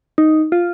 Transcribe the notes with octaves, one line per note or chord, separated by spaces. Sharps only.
D#4
F4